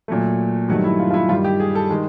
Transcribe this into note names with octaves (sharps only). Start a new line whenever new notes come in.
A#2 F#3 A3
G2 D#3 F#3 A3 F#4
E4
F4
F4
E4
G2 D#3 G3 F4
G4
G#4
A4
D#3 G#3